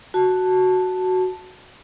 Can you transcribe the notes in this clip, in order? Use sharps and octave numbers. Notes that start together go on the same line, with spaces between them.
F#4 A5